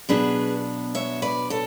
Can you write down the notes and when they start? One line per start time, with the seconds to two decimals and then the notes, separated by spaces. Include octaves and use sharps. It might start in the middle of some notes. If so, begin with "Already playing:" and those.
0.09 B2 F#3 B3 D4 G#4 B4
0.95 C#5 E5
1.22 B4 D5
1.50 A4 C#5